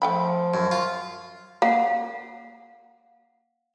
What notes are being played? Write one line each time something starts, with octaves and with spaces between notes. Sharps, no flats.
F3 A3 G5 B5
F#2
F4
A#3 F5 F#5